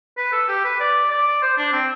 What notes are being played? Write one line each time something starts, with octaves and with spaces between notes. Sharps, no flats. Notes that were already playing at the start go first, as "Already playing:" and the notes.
B4
A4
G4
B4
D5
D5
C5
D4
C4